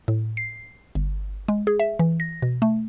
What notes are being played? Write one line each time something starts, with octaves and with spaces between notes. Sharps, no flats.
A2
C7
G1
G#3
G#4
E5
E3
A#6
B2
A3